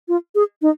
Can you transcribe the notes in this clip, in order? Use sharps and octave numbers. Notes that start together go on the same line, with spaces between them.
F4
G#4
D#4